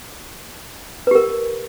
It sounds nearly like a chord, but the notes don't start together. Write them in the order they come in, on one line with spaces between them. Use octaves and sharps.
B4 G4 A#4